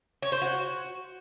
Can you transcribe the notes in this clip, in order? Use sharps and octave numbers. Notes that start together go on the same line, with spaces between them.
C#5
C5
F#4